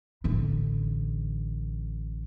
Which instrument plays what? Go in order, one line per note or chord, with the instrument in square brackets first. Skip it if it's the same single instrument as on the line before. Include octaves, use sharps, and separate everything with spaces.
[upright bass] A1 D3